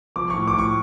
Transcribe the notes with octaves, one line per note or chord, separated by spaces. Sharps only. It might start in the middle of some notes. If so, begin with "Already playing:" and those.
F3 D6
A2 C#6
D6
A2 C#6